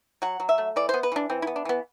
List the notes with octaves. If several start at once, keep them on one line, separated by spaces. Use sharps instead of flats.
F#3 F#5
F#3
E5
A3
E3 D5
C5
B3
B4
E3 D4
E3 C4
E4
B3
D4
E3 B3